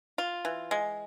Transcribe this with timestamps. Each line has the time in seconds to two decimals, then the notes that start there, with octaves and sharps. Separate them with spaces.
0.18 F4
0.45 E3
0.71 G#3